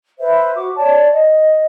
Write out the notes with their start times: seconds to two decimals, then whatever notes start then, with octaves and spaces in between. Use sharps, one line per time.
0.20 B4 C5 E5
0.54 F#4 D6
0.76 C#5 D5 A5
1.12 D#5